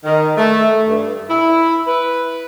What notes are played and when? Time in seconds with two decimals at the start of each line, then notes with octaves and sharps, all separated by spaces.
0.04 D#3
0.37 A3
0.87 G2
1.29 E4
1.87 B4